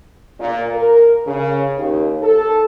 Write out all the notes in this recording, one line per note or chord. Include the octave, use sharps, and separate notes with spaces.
A#2
A#4
C#3
D#2
A4